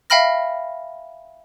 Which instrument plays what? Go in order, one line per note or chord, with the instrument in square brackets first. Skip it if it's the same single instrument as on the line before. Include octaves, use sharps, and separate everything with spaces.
[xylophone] E5 F5 G5 B5 F6 A#6